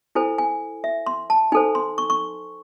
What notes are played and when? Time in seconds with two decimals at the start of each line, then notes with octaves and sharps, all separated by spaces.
0.15 E4 A4 C5 G#5
0.38 G#5
0.84 E5
1.06 C6
1.30 A5
1.52 D#4 G#5
1.55 A4 C5
1.75 C6
1.98 C#6
2.10 C#6